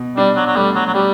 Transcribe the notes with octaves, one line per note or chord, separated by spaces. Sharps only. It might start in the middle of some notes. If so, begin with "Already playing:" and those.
Already playing: B2
G3 D4
F#3
F#3
G3 A3
F#3
F#3
G3 G4